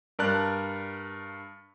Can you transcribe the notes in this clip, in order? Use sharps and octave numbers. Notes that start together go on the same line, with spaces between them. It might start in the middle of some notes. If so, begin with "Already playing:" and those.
G2 A#4 D5 A5 F#6